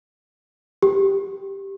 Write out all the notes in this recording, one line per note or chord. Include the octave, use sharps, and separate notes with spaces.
G4